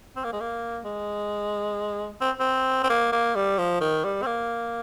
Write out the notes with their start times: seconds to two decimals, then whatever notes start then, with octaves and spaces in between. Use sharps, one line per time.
0.16 C4
0.24 A#3
0.33 G#3
0.40 A#3
0.84 G#3
2.21 C4
2.40 C4
2.84 C4
2.90 A#3
3.12 A#3
3.35 G3
3.58 F3
3.81 D#3
4.04 G3
4.22 C4
4.26 A#3